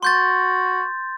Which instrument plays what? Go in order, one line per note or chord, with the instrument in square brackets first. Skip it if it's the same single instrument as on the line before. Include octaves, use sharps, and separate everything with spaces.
[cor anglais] F#4 [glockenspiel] C6 G6 A6